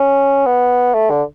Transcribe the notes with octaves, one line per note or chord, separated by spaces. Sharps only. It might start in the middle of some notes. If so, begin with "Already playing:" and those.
Already playing: C#4
B3
A3
D3